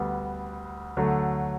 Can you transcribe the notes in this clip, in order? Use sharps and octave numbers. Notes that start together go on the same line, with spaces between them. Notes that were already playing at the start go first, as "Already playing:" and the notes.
Already playing: D2 D3 G3 B3
D2 D3 F#3 A3